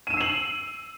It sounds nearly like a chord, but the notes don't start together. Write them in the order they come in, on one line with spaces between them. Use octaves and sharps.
D#7 E7 E6 C7 F#7